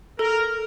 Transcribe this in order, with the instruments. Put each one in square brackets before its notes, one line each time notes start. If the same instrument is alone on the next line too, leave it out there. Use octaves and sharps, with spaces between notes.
[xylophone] A4 [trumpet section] A#4